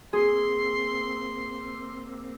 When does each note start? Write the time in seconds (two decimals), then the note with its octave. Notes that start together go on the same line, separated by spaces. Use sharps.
0.13 A#3 C4 G#4 C6